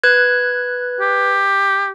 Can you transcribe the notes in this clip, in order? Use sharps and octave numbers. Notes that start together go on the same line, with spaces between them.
B4 F#6 G#6
G4